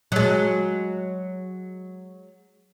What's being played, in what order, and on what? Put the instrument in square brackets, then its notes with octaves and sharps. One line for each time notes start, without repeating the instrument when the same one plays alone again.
[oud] F#3 G#3